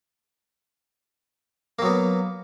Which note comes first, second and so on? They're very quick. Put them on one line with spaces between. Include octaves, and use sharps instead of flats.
A#3 F#3 B3